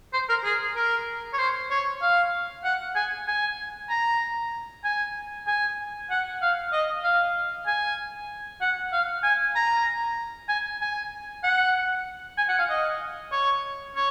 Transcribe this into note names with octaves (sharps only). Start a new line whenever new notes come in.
C5
A#4
G#4
A#4
C#5
C5
C#5
F5
F#5
G#5
G#5
A#5
G#5
G#5
F#5
F5
D#5
F5
G#5
F#5
F5
G#5
A#5
G#5
G#5
F#5
G#5
F#5
F5
D#5
C#5
C#5